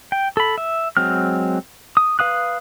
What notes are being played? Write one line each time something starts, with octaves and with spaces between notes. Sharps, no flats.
G5
A4 B5
E5
F#3 G#3 C4 F6
D#6
B4 F5 D#6 F#6